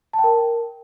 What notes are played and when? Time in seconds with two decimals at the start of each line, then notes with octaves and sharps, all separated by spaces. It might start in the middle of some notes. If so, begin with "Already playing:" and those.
0.13 A5
0.19 G5
0.24 A#4